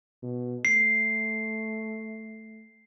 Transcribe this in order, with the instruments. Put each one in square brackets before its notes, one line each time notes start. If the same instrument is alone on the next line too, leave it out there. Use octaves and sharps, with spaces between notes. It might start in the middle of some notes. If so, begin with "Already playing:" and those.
[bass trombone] B2
[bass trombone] A3 [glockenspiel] C7